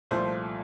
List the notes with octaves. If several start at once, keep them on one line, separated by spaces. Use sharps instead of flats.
C2 A#2 F3 A3 C5